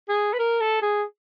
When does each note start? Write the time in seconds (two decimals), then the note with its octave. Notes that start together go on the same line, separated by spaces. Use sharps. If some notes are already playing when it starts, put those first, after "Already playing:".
0.09 G#4
0.33 B4
0.39 A#4
0.60 A4
0.82 G#4